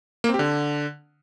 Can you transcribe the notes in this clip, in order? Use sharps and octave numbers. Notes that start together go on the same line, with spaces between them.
A#3
C4
G4
D3